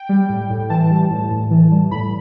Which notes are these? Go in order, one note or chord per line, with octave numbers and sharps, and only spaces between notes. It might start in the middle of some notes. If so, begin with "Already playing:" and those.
Already playing: G5
G3
A2
A2
E3 A5
G3
A2
A2
E3
G3
A2 B5